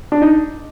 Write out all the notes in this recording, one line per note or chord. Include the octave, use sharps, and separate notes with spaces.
D4
D#4